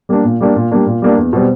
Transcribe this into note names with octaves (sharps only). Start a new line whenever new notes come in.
G3 A#3 D4
A#2
G3 A#3 D4
A#2
G3 A#3 D4
A#2
G3 A#3 D4
E2
B2 G3 C4